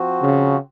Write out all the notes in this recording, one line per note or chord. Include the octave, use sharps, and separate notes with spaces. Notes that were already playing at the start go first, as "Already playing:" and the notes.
Already playing: F3 C4 F#4
C#3